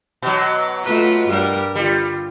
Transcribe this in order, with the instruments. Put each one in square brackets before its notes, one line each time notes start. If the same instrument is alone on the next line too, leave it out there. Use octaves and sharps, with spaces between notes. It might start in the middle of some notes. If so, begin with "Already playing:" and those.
[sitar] B2 F#3
[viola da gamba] A3 F4 B4
G2 G3 A#4
[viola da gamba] D3 F4 [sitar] G3